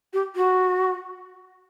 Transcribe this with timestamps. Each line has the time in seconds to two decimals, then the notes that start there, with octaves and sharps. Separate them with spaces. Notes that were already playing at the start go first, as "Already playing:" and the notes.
0.13 G4
0.36 F#4